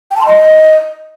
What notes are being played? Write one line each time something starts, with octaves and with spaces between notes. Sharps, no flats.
G5
A5
C6
D#5